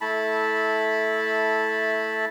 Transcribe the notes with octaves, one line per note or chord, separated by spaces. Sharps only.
A3 E4 A5 B5